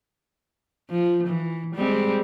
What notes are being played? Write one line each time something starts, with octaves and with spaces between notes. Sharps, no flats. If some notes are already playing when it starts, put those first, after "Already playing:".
F3
E3
G3 G#3 C4